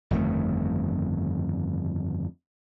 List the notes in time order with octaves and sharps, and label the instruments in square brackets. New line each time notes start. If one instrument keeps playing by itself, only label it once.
[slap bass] G1 F2 D#3 A3